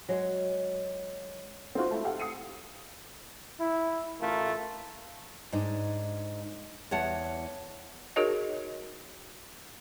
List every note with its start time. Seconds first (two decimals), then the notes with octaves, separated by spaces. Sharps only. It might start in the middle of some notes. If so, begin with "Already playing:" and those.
0.09 F#3 G#3
1.75 C4 D#4 F4 F#4
1.91 A3 E4
2.05 G4 A4 F5 F#5
2.20 D#6 E6 C7 C#7 D#7
3.60 E4
4.21 A1 A3 F4 A#4
5.52 G#2 D4 D#4
6.91 E2 C#5 F#5 A5
8.16 D#4 F#4 G#4 A#4 C#5 D#5